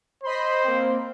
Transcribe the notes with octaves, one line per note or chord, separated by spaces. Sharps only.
C5 D#5 B5 C6
A#3 C4